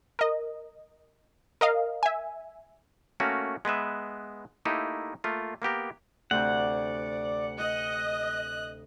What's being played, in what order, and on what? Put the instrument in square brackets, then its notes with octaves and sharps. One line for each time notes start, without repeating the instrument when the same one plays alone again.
[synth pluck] A#4 D#5
A#4 D#5 F5
E5 G#5
[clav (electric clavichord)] A3 A#3 C#4 F#4 A#4
G#3 B3 B4 E5
A3 A#3 D#4 E4 G4
A3 A#3 F4
A#3 B3 G4 A#4
[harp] D2 C3 G6 [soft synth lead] D5 [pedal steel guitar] F#5
[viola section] D#5 [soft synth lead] F#6